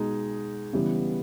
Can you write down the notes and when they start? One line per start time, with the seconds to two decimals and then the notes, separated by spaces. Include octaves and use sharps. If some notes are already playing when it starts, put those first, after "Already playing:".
Already playing: B2 G#3 D#4 G#4
0.73 C#3 E3 G3 B3